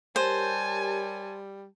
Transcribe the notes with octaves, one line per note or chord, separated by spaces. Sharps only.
G3 G4 A#4 C5 C#5 G#5 A5